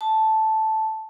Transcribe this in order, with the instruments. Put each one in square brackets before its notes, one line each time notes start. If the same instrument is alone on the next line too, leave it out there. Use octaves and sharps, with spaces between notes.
[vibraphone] A5